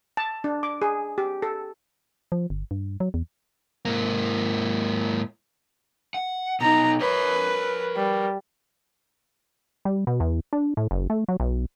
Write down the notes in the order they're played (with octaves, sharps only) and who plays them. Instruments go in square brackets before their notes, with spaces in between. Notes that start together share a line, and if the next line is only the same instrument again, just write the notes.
[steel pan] A5
D4
D6
G#4
G4
A4
[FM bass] F3
G1
G2
F#3
E2
[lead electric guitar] G#2 A#3
F#5
[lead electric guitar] B2 D#4 [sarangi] A#5
[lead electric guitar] A#4 C#5 [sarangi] B4
[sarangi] G3
[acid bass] G3
B2
E2
D4
A2
F#1
A3
F#3
B1